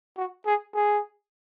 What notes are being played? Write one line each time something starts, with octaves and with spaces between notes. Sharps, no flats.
F#4
G#4
G#4